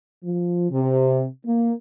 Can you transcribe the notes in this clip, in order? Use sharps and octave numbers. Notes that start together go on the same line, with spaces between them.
F3
C3
A#3